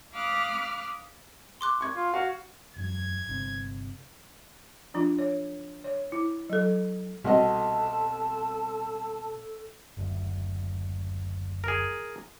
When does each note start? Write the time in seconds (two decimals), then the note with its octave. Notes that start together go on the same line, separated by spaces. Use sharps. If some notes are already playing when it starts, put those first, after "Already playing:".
0.13 F5 B5 D6 D#6 F6 F#6
1.61 C6 D6 F#6
1.81 C#6 G#6
1.96 F4
2.14 F#4 F5
2.76 E1 F#2 G#6
3.28 G1 C3
4.94 F3 D4 F4
5.19 C#5
5.84 C#5
6.12 E4
6.49 F#3 A4
7.24 C2 B2 F#4 A4 D#5 A5
9.97 F#1 D2
11.64 G#4 A#4